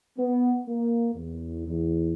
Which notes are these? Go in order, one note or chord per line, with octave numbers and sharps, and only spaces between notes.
B3
A#3
E2
E2